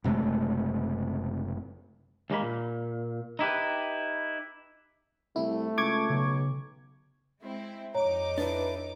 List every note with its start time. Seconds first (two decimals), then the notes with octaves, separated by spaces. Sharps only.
0.04 F#1 C3 G#3 A3
2.30 D#2 G#3 A#3 B5
2.42 A#2
3.39 D#4 E4 G4 B4
5.36 C2 A3 E4
5.78 C#2 C#6 D6 G#6
6.10 B1 C#3
7.41 G#3 C4 E4
7.95 F2 D#4 C#5 A#5 D6
8.38 D4 E4 B4